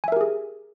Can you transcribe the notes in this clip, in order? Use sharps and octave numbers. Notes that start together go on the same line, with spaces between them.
G4 G#4 A#4 E5 G#5